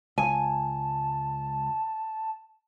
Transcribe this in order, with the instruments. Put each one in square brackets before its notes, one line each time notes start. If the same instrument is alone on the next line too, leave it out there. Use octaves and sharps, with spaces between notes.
[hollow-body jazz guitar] C#2 [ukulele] G#5 [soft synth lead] A5